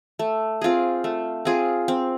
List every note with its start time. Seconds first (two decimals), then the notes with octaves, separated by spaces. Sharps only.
0.19 A3
0.61 C4 F4 G#4
1.04 A3
1.45 C4 F4 G#4
1.88 C4